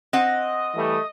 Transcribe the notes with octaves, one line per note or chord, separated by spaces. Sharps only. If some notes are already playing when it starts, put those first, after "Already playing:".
C4 D#5 F#5
E3 G3 A3